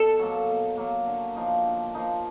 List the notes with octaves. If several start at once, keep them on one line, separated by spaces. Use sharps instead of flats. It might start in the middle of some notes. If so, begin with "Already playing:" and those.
Already playing: B2 A4
F#3 A#3
B2
F#3 A#3
D3
F3 A#3 D#4
D3
F3 A#3 D#4